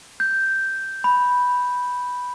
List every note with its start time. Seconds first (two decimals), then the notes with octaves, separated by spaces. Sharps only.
0.20 G6
1.04 B5